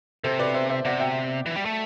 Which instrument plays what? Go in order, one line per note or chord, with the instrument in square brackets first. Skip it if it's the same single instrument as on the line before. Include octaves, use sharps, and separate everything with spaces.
[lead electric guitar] C3 [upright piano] A4 C5
[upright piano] B4 D5
C5 E5
C5 E5
[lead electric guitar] C3 [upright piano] D5 F#5
[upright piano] E5 G5
[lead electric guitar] E3
G3
A3